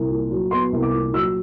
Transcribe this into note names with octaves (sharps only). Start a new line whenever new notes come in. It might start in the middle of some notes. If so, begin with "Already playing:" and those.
Already playing: C2
A#2
F#3
B3 C6
C2
D6
A#2
F#3 E6